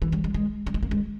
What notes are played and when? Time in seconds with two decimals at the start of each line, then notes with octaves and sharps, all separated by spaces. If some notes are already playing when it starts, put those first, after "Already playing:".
0.02 E3
0.12 G3
0.24 G#3
0.34 G#3
0.67 G3
0.74 G#3
0.83 A#3
0.91 G#3